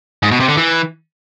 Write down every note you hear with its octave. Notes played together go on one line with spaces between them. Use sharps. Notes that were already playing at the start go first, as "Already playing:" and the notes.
G#2
B2
C3
D3
E3